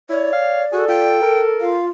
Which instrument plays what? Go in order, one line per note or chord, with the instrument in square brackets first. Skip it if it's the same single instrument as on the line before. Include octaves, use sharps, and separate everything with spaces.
[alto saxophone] E4 [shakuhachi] C#5 [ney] D5
[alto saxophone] F5
[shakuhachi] F#4 [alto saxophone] G#4 [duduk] A4
[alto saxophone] F4 [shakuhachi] G5
[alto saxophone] A#4
[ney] F4 [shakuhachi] F5